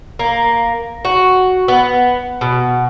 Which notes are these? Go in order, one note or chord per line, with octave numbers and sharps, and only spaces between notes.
A#3
F#4
B3
B2